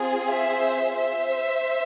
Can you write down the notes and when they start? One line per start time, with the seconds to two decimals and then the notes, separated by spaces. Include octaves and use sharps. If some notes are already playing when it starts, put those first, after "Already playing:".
Already playing: C4 F4 G#4
0.30 C5 E5
0.97 C5 E5